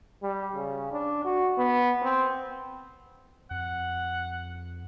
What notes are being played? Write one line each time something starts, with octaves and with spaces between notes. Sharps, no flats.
G3
C#3
D4
F#4
B3
C4
F2 F#5